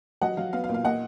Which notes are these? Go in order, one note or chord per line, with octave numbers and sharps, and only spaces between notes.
F#3 D#5 F#5
F#3 F5
B3 F5
F5
A#2
F5
A#2 D#5 F#5